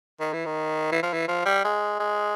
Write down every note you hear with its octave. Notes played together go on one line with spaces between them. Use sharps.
D#3
E3
D#3
E3
F3
E3
F3
G3
G#3
G#3